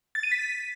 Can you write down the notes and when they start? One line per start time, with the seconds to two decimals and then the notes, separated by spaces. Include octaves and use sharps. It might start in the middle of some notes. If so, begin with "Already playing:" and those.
0.15 A6
0.23 D#7
0.32 B6